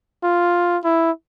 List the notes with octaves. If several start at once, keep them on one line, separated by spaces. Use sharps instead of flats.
F4
E4